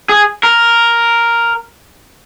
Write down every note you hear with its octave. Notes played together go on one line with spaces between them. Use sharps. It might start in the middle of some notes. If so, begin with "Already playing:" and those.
G#4
A#4